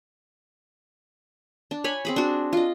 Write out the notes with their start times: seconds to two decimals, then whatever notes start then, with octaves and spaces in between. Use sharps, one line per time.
1.71 D4
1.84 C#5 G#5 B5
2.05 C4 G#4 B5
2.16 D4 F#4
2.53 F4 D#5